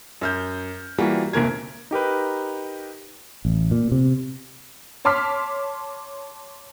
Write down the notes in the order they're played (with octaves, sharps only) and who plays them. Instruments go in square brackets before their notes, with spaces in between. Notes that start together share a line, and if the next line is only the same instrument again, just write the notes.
[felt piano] F#2 F6 G6
E3 G3 A#3 F4 F#4
F1 D2 A#2 A#4 G#6
[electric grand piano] D#4 G4 A#4 B4
[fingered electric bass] A1
A#2
C3
[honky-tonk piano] C#5 A5 C6 D6 F6 B6